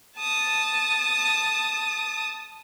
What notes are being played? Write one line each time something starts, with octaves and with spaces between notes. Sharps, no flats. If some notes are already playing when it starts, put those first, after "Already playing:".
A5 D#6